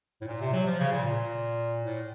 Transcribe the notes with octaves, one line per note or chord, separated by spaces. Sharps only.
A2
A#2
C3
F#3
F3
C#3
A#2
A#2
A2